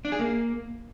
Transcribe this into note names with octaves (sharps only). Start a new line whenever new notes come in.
D4
G#4
A#3